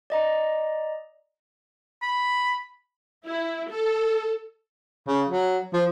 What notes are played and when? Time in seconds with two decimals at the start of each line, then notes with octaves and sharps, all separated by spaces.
0.10 D5 D#5 A#5
2.02 B5
3.25 E4
3.70 A4
5.08 C#3
5.29 F#3
5.73 F3